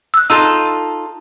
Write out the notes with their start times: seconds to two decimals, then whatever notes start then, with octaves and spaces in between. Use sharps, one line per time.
0.14 E6 F#6
0.30 D#4 F4 A4 E6